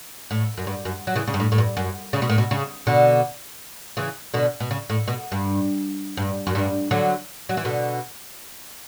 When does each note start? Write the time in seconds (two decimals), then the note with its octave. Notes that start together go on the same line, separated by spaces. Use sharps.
0.31 A2
0.58 F#2
0.67 G2
0.85 F#2
1.07 F#3
1.16 C#3 E3
1.28 C#3
1.34 G2
1.40 A2
1.52 A2
1.58 G2
1.77 F#2
2.13 C#3
2.22 B2
2.30 A2
2.38 B2
2.51 C#3
2.87 B2 D3
3.97 C#3 E3
4.34 B2 D3
4.60 B2
4.71 C#3
4.90 A2
5.08 B2
5.32 G2
6.17 G2
6.47 F#2
6.55 G2
6.91 D3 F#3
7.49 F#3
7.57 E3
7.65 B2 D3